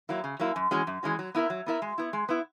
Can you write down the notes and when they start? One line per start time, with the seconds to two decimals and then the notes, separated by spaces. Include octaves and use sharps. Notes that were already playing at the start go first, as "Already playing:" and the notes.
0.09 F#3 A#3 E4
0.24 C#3
0.39 F#3 A#3 E4
0.56 F#2
0.71 E3 G#3 C#4 F#4
0.87 F#2
1.03 E3 G#3 C#4 F#4
1.19 F#3
1.35 B3 E4 A#4 E5
1.50 F#3
1.66 B3 E4 A#4 E5
1.82 G#3
1.98 B3 E4
2.13 G#3
2.29 B3 E4